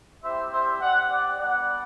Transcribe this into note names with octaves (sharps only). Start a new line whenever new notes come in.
G3 C4 E4 G4 C5 E5
C5 E5
C4 G4 D5 F#5
D5 F#5
G3 B3 D4 D5 F#5